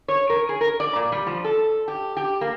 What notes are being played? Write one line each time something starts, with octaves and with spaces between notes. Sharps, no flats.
C#5
A#4
G#4
A#4
D5
A#2
G3
F3
A4
G4
G4
A#3